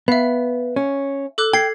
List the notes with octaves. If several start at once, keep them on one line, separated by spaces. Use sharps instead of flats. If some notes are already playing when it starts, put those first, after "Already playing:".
B3 E5 F5
C#4
A4 D6 F#6
G5 G#6 C7